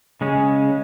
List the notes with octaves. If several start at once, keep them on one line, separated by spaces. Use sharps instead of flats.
C#3 G#3 C#4